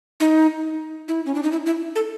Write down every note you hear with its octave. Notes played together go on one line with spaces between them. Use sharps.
D#4
E4
C#4
D4
D#4
E4
E4
A4